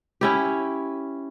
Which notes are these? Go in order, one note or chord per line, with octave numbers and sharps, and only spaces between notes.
C#4 E4 G4